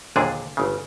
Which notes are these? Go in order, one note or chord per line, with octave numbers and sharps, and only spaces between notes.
A#1 D#2 A#2 D3 D4 G#4
G1 C#3